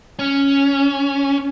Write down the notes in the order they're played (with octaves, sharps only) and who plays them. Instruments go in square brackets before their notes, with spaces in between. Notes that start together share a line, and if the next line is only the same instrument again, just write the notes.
[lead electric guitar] C#4